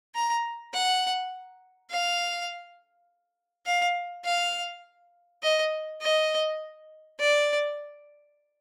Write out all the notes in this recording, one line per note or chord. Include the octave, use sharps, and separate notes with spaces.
A#5
F#5
F5
F5
F5
D#5
D#5
D5